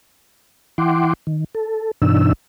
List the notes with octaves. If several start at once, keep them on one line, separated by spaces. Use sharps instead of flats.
E3 E4 F#5 G5 C6 D6
D#3
A4
G2 B2 E3 D4 D#4 E6